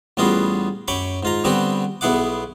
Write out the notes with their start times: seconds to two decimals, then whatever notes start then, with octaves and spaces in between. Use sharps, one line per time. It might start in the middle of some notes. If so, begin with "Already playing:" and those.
0.17 A1 G3 B3 F4 F#4 G#4
0.88 F#2 C#5 G5 B5 C#6 D6
1.23 G#2 F4 A#5
1.44 D3 G3 B3 C4 F#4 G4
2.01 B1 B3 E4 G#4 F#5 D6